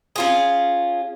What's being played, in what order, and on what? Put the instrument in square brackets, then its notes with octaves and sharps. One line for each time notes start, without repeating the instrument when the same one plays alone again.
[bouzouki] C#4 F4 G#4